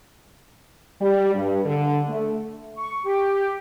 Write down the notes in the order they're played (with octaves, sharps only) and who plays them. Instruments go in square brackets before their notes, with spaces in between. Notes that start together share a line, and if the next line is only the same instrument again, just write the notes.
[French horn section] G3
G2
D3
A3
[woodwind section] C#6
G4